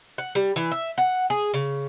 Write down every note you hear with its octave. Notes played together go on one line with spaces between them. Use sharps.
F#5
G3
E3
E5
F#5
G#4
C#3